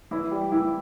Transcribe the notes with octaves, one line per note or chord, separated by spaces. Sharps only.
E3 E4
G3 G4
E3 E4